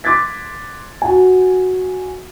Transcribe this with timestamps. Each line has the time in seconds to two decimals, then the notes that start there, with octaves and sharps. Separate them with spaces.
0.04 C6 D6 F#6 G#6 A6 B6
1.02 F#4 G#5